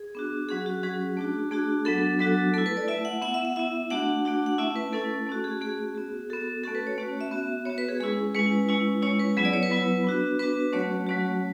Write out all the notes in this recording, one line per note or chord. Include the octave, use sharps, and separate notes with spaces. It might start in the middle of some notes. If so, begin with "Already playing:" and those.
Already playing: G#4
B3 D4 F#4
F#3 C#4 F#4 G#4
F#4
F#3 C#4 F#4 G#4
A3 D4 F#4
A3 D4 F#4 G#4
F#3 B3 D4 F#4 A4
F#3 B3 D4 F#4 A4
A3 E4 A4
B4
D5
A3 E4 E5
F#5
B3 E4 F#5
E5
F#5
B3 E4 E5
A3 D4 F#4 F#5
A3 D4 F#4
F#5
A3 C#4 E4 E5
B4
A3 C#4 E4 A4
A3 C#4 F#4
G#4
A3 C#4 F#4 G#4
B3 F#4
B3 F#4 A4
A3 C#4 F#4 A4
B4
C#5
A3 C#4 F#4
E5
B3 F#4
B3 F#4 C#5
B4
G#4
G#3 C#4 E4 G#4
G#3 C#4 E4 B4
G#3 C#4 E4
G#3 C#4 E4 C#5
B4
F#3 B3 E4 G#4
D5
C#5
B4
F#3 B3 E4
B3 D4 F#4
B3 D4 F#4 B4
F#3 A3 C#4 F#4 C#5
F#3 A3 C#4 F#4